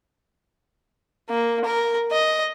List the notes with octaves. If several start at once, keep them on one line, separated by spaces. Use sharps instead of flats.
A#3
A#4
D#5